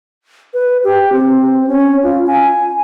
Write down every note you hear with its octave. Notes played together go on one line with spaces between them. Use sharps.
B4
G4
C4
C#4
F4
G#5